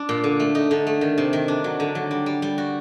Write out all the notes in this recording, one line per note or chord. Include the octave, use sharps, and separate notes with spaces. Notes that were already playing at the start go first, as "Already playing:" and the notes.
Already playing: D4
A#2
D3
A3
D#4
D3
A3
D#3
C3
D#3
D4
F#3
D3
F#3
G3
G3
G3
F#4